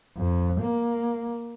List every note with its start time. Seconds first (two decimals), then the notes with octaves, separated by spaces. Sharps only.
0.17 F2
0.61 A#3